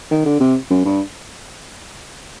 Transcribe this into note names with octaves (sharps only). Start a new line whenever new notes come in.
D#3
D3
C3
F#2
G2